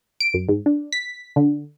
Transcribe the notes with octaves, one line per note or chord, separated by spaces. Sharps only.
D7
F#2
G#2
D4
B6
D3